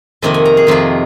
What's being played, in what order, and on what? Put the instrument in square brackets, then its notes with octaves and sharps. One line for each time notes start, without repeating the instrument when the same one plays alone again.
[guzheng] F2 C3 D#3 A#3 D#5
G#5
A#5
G#4
F2 C3 D#3 A#3 F4